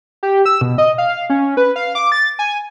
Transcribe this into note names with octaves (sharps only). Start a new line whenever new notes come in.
G4
E6
B2
D#5
F5
C#4
B4
F5
D6
A6
G#5